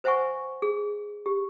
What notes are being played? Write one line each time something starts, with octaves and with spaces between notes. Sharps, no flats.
B4 C5 E5 F#5 G#5 C#6
G#4
G4